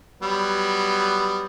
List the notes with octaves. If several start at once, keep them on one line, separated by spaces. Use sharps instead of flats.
F#3 G3 B3